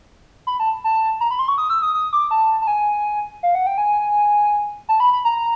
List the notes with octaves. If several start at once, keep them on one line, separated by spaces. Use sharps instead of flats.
B5
A5
A5
A#5
B5
C6
C#6
D#6
E6
D#6
D#6
D6
A5
A5
G#5
F5
F#5
G5
G#5
A5
B5
B5
A#5